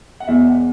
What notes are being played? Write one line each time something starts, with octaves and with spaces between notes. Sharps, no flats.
F#5
E1 E2 B2 E5
F#5